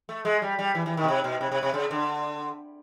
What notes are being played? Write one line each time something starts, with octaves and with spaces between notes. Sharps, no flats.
A3
G#3
G3
G3
E3
E3
D#3
B2
C3
B2
C3
C3
C3
C#3
D3